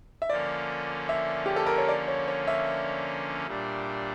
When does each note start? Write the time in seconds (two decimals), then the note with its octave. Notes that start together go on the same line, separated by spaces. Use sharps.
0.22 E5
0.30 D3 F3 A#3 C#4 D5
1.09 E5
1.46 G4
1.56 A4
1.66 A#4
1.78 C#5
1.89 D5
2.08 C#5
2.28 C#5
2.48 E5
3.47 A#2 G3 D4